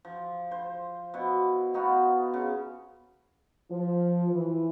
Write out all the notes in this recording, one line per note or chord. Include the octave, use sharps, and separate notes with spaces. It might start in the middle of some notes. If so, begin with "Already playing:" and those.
F3
C5
B2 E4
B3 D#4 F4 F#4
C#3
F3
E3